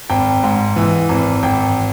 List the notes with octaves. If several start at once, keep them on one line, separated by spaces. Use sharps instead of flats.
G#1 G5
G#2
E3
G#1
G#1 G5